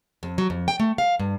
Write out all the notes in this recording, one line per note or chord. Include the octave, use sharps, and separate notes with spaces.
F2
F#3
F2
G5
A3
F5
G2